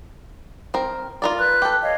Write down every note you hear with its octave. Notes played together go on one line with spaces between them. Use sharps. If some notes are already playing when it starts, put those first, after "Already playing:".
C4 A#4
F4 A#4 D5
B4 F#6
G4 A4
C#5 D#5 F5